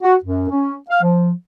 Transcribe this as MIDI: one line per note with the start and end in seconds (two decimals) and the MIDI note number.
0.01 0.15 66
0.23 0.47 42
0.49 0.75 61
0.89 1.00 77
1.02 1.31 53